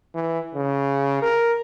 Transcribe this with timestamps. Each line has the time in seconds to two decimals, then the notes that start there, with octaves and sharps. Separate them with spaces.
0.15 E3
0.55 C#3
1.22 A#4